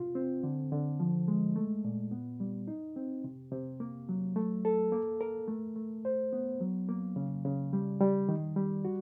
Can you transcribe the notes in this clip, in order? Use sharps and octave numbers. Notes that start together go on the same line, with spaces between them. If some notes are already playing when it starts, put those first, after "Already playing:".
Already playing: C3 F4
C4
D3
D3
F3
G#3
A3
A#2
B3
G3
D#4
C4
C3
C3
A#3
F#3
A3
A4
A#3
A#4
A3
A3
C5
B3
F#3
A#3
C#3
C#3
G3
G3
D#3
G3
F#4